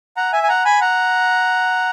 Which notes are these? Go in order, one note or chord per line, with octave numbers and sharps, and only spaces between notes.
F#5 A#5
E5 G#5
G#5
F#5 A#5
G#5 B5
F#5 A#5